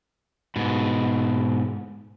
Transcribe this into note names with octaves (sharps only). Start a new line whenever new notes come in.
G#2 B2